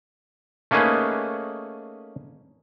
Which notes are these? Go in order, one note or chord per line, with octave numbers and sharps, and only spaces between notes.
A3 A#3 C#4 D#4 G#4 B4